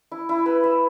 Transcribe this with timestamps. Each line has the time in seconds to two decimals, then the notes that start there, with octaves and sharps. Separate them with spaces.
0.12 E4
0.29 E4
0.46 B4
0.64 E5